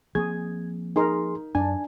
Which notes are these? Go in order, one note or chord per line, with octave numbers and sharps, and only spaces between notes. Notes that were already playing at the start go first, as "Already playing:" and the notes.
F3 A#3 C4 G#4 G#6
D#4 G#4 A#4 C6
F#2 D4 G#5